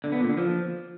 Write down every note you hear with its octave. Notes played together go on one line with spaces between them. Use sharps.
D3
B3
A#2
D3
F3